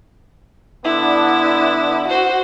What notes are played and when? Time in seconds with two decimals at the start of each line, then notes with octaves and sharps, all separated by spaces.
0.84 D3 B3 D4 E4
2.08 F#4 C5